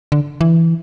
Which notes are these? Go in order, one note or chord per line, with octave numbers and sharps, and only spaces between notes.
D3
E3